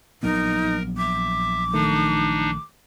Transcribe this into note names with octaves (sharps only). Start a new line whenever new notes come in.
A#1 F#3 B3 D#4 A#4
E5 D6
D#3 A3 D4 D#4